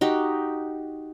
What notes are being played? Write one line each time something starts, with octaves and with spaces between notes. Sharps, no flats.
D#4 F#4 G4